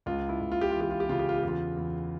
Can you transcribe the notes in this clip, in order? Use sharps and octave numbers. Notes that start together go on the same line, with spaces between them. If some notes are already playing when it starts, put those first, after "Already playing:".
C#2 F4
E4
C#2
F4
G4
E3 F4
G4
F4
G4
C#3 F4
G4
F4
E2 G4
F4
E2